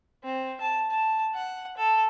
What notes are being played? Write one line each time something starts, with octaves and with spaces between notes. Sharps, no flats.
C4
A5
A5
F#5
A4